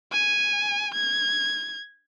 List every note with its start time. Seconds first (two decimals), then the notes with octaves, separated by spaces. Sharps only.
0.12 G#5
0.95 G#6